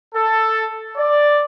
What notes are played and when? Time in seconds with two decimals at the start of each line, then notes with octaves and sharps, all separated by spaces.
0.15 A4
0.96 D5